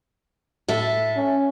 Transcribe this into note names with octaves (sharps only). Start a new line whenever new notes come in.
A2 A4 E5
C#4